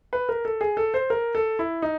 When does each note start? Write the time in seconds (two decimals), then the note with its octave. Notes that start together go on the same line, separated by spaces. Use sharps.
0.13 B4
0.29 A#4
0.45 A4
0.61 G#4
0.77 A4
0.94 C5
1.10 A#4
1.35 A4
1.59 E4
1.82 D#4